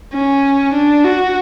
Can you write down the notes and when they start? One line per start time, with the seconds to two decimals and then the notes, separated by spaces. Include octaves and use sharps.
0.13 C#4
0.73 D4
1.04 F#4